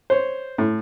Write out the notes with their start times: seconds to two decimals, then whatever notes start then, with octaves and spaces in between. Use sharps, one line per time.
0.10 C5 C#5
0.58 A2